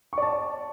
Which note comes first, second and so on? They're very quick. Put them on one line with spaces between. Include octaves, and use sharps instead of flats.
C#6 D5 A5